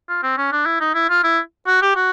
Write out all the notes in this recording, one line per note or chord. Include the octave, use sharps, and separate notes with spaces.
F4
C4
C#4
D4
E4
D#4
E4
F4
E4
F#4
G4
F#4